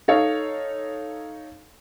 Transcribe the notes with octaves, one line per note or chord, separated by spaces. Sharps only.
D#4 A4 C#5 F5